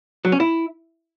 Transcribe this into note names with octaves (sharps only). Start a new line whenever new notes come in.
F#3
C#4
E4